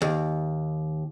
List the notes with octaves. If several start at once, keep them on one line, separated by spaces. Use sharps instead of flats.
D#2